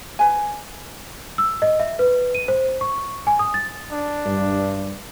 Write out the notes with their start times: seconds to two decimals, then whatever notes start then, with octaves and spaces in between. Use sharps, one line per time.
0.19 B4 G#5
1.38 E6
1.62 D#5
1.80 E5
1.99 B4
2.35 D#7
2.48 C5
2.81 C#6
3.27 G#5
3.39 D#6
3.54 A6
3.92 D4
4.26 G2